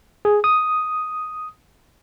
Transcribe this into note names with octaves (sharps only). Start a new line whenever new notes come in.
G#4
D#6